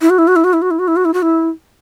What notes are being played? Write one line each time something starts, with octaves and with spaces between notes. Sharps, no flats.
E4
F#4
E4
F#4
E4
F#4
E4
F#4
E4
F#4
E4
F#4
E4
F#4
E4